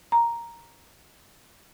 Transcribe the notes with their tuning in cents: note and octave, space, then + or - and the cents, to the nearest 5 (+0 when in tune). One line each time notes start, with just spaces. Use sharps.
A#5 +0